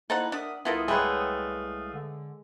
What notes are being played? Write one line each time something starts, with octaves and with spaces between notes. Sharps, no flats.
A#3 D#4 E4 A4 C5 F#5
D4 A#4 E5 F#5 D#6
C2 B3 E4 F4 A4 A#4 F5 D#6
G#3 A3 B4 C#5 F#5 G5
D3